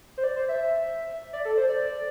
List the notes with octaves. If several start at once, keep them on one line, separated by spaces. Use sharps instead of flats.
C5
D5
C5
E5
D5
A4
C5
D5